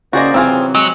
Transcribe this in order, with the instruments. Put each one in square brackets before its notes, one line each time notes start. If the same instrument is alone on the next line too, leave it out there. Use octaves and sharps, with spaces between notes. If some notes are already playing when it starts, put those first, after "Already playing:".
[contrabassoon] C#3 [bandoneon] A#3 C5 D5 [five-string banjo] F#4 G#4 D#5
[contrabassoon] C3 [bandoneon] E3 F#3 [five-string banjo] C4 F4 G#4
[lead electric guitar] F#3 [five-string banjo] G#3